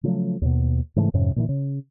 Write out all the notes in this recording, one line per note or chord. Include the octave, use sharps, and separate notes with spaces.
C#3 F3 F#3 A3
D#2 B2
G#2 C#3 E3 A3
F2 G#2 C3 C#4
A#2 D#3 E3
C#3